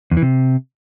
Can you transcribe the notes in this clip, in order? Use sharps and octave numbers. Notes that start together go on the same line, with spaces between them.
E2
E3
C3